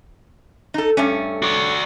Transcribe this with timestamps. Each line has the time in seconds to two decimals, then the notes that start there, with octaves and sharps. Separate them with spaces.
0.74 D#4 A4
0.97 G2 A3 C#4
1.42 F#4 D5